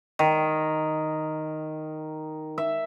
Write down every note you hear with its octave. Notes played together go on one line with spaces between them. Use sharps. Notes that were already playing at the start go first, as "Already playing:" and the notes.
D#3
E5